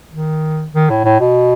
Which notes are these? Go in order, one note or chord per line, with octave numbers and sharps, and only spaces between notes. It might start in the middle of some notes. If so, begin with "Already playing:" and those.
D#3
D#3
A2
A2
B2